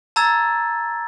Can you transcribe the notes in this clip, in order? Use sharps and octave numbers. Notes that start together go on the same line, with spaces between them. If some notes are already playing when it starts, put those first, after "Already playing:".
A5 A#5 E6 G#6 A6